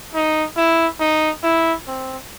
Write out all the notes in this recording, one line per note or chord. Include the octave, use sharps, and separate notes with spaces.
D#4
E4
D#4
E4
C4